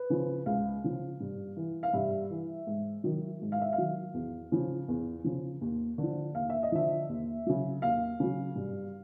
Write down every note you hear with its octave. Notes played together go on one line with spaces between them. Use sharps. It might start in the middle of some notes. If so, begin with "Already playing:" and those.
Already playing: B4
C#3 F3
C#2 F5
C#3 F3
G2
E3
F5
G2 E5
E3
G#2
D#3 F#3
G#2
F5
E5
F5
D#3 F#3
E2
C#3 F3
E2
C#3 F3
D#2
D3 F3
D#2 F5
E5
D#5
D3 F3 E5
D#2
C#3 F#3
D#2 F5
C#3 F#3
G2